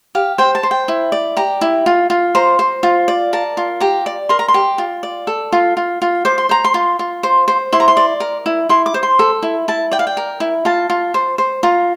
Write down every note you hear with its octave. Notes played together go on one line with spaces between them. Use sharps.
G4 F5
C5 G5
A5
C5
G5
E4
D5
G4 A#5
E4
F4
F4
C5 A#5
C5
F4
D5
A#4 A5
F4
G4 A#5
D5
A#4 C6
A#5
C6
G4
F4
D5
A4
F4
F4
F4
C5 D6
C6
C5 A#5
C6
F4
F4
C5
C5
E4 C6
A#5
C6
D5
A#4
E4
E4 C6
D6
C5
C6
A4
E4
E4 A5
D5 G5
F5
G5
A#4
E4
F4 A5
F4
C5
C5
F4 A#5